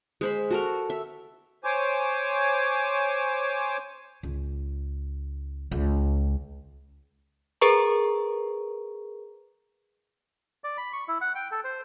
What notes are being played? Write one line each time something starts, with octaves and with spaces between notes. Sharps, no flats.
G#3 C5 B5
F#4 A4 A#4
E5
C5 C#5 G#5 D6
C#2
C#2
G#4 A#4 B4 A#5 C#6
D5
B5
C#6
E4
F#5
G5
A4
C5